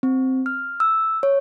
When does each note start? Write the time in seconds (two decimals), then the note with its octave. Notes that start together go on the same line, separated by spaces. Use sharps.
0.03 C4
0.46 F6
0.80 E6
1.23 C#5